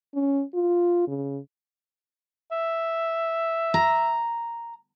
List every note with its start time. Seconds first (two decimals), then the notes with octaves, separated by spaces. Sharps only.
0.14 C#4
0.54 F4
1.08 C#3
2.52 E5
3.74 A#5